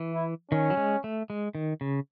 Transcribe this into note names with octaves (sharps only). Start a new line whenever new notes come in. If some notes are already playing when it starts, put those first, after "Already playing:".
Already playing: E3
E4
D#3 C#4
F#3
G#3
A3
G#3
D#3
C#3